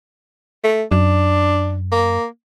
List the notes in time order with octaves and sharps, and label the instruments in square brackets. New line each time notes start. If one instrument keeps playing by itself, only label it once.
[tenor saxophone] A3
[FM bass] F#2 [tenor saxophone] D4
[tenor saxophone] A#3